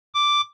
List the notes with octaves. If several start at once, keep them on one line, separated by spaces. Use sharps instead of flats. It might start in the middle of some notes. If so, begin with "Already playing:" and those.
D6